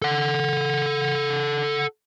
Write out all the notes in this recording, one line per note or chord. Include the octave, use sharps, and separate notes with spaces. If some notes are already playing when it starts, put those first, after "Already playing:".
A4 F#5